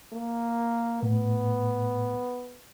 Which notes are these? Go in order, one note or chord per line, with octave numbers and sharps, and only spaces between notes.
A#3
A2 B3